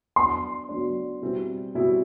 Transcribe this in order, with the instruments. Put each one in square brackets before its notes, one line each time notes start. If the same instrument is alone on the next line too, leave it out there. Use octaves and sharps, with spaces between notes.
[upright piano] F#3 B3 D4 [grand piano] C6
[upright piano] F#3 B3 D4
B2 G3 C4 E4
B2 G3 C4 E4